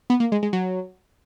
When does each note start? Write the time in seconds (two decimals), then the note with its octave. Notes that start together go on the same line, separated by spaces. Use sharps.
0.10 B3
0.20 A#3
0.32 G#3
0.43 G#3
0.53 F#3